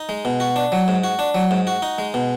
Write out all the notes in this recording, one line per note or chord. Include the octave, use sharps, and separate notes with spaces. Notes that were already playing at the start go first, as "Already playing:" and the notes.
Already playing: D#4
G#3
B2
F#4
D4
F#3
G#2
F#4
D4
F#3
G#2
F#4
D#4
G#3
B2